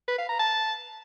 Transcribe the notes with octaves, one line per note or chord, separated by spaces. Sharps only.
B4
F5
A#5
A5